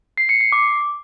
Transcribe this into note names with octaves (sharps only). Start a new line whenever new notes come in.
C7
C#7
C7
D6